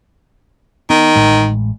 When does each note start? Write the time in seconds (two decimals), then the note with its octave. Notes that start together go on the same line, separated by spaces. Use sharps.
0.90 D#3 B3
1.16 A1 A2 G#3